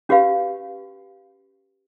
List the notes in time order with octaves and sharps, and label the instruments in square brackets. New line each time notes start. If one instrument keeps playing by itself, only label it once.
[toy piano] C#4 F#4 G4 B4 F5